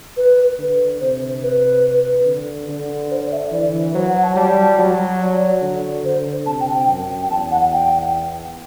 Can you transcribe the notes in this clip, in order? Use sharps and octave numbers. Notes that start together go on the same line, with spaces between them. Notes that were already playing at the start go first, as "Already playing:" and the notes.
B4
D3
C3 C5
B4
D3
D3
C5
D5
E5
D5
E3
F#3 C5
F#5
A5
G3 A5
F#3
D5
D3
D3 C5
C3 A5
G5
G5
F#2
G5
E2 A5
F#5
G5